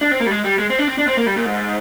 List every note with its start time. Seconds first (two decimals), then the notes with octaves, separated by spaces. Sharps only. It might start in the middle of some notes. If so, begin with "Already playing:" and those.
0.01 D4
0.11 C4
0.20 A#3
0.26 G3
0.31 G#3
0.44 G3
0.59 G#3
0.70 C4
0.79 D4
0.88 C4
0.98 D4
1.08 C4
1.17 A#3
1.26 G3
1.36 A#2
1.46 G#2